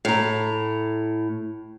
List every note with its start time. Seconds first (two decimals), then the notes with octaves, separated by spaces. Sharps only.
0.05 A2 A#5